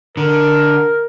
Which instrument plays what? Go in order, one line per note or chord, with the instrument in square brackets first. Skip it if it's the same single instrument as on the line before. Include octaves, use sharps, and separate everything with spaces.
[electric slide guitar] D3 [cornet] A#4